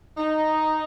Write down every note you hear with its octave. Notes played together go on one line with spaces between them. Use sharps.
D#4